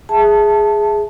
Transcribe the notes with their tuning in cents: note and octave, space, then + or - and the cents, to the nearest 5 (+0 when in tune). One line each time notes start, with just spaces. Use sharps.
G#4 +0 E5 +0 A5 +0